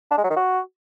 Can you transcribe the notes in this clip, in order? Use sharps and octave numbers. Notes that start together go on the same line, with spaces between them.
D4
G#3
F#3
D#3
F#4